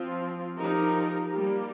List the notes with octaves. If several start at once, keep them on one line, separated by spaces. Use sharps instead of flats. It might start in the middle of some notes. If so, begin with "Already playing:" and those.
Already playing: F3 C4 F4
F3 D#4 G4 A#4
G3 A#3 G4